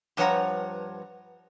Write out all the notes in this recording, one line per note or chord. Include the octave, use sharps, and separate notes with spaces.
G2 F3 B4 C#5 F#5 A#5